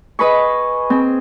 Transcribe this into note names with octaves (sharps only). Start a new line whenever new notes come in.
G#4 B4 D#5 B5 C#6
C4 G#4